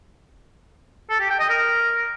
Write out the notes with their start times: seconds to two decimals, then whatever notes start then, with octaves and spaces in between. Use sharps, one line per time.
1.10 A4
1.20 G4
1.30 G5
1.40 D#5
1.50 A#4